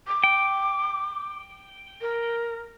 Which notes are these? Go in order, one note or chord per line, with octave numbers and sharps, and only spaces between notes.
D6
G5
A#4